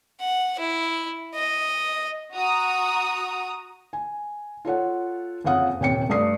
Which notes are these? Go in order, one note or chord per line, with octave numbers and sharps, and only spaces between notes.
F#5
E4
D#5
F#4 A#5 D#6
G#5
F4 A4 C#5 F#5
F#1 F2 C#3 F5 F#5 D#6
D#1 C3 C#5 G5 C#7
G2 A3 D5 D#6 C7